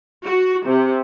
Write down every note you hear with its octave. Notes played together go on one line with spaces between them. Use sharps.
F#4
C3